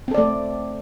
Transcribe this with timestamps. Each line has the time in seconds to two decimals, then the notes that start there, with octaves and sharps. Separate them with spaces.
0.08 C4
0.11 A4
0.14 D5
0.18 A3